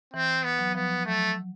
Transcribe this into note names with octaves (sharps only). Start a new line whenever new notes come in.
E3 C4
B3
F#3
F3 B3
F#3 A3